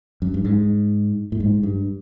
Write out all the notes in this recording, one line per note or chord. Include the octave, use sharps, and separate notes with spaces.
F#2
G2
G#2
A2
G#2
G2